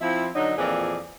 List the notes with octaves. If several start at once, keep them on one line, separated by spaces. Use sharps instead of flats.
F3 C4 E4
D3 F#3 D#4
F2 A#2 E3 F3 G#4 D5